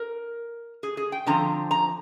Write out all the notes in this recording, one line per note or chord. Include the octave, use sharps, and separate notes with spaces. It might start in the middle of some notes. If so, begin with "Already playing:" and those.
Already playing: A#4
G#4
G#4
G5
D3 F3 C4 A#5
A#5